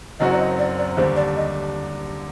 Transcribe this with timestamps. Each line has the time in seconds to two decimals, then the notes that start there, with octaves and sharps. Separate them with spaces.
0.20 F#1 F#2 F#3 C4 F#4 D#5
0.32 D5
0.39 D#5
0.59 D5
0.78 D5
0.97 D#2 D3 G3 D4 C5
1.16 D5
1.37 D#5